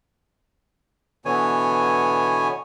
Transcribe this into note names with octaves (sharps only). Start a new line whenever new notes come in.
B2 D3 E3 B3 C#5 G#5